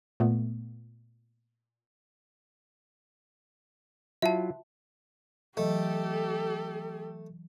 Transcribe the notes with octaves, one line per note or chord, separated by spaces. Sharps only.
A#2 A3 B3
F#3 E4 F4 E5 A5
E3 F#3 A3 G4 A4 D#5